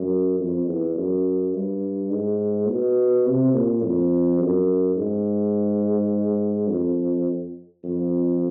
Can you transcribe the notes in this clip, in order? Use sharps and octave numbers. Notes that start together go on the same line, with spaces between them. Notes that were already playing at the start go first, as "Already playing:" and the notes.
Already playing: F#2
F2
E2
F#2
G2
G#2
B2
C3
A#2
F2
F#2
G#2
F2
F2